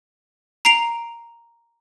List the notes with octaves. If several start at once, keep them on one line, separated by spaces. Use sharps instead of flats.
A#5 C7 D7 F7